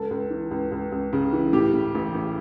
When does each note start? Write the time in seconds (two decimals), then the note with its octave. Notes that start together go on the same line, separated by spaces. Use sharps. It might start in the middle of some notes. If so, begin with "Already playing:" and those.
Already playing: C#2 A4
0.11 C#2
0.30 E3
0.51 C#2
0.71 C#2
0.92 C#2
1.13 C#3
1.33 E3
1.53 A2 G4
1.73 A2
1.94 A1
2.14 A1